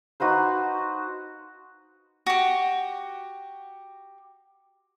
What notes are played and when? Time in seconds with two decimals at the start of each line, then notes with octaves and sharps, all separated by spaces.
0.20 D#4 F#4 B4 C5
2.26 F#4 G4